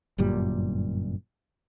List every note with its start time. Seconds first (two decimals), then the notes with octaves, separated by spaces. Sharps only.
0.18 G1 F#2 A#2 G3